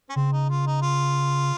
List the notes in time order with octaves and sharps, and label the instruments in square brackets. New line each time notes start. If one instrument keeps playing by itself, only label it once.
[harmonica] C#4
[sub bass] C#3 [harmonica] C4
[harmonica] D#4
F4
D#4
F4